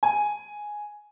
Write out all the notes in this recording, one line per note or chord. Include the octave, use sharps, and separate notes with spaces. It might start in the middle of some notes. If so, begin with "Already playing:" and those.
G#5